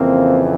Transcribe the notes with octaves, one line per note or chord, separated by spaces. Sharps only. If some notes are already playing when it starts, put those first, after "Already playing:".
Already playing: F2 C#3 E3 A#3 C4